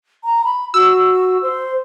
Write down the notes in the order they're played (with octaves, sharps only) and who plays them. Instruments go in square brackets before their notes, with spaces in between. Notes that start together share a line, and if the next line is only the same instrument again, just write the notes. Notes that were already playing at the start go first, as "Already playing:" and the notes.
[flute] A#5
B5
[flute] F#4 [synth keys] E6
[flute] C5